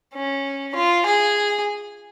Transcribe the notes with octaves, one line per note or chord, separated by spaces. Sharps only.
C#4
F4
G#4